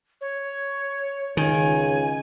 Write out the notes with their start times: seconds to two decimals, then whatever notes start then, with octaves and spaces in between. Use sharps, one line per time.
0.20 C#5
1.37 C#2 D#3 G#5